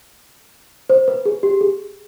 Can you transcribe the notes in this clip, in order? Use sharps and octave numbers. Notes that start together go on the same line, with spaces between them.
C5
B4
G#4
G4
G#4